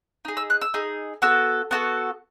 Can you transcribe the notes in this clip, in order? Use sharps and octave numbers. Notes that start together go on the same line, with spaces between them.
D#4 G#4
E6
F#6
E6
D#4 G#4
B3 F#4 A4 E6
B3 F#4 A4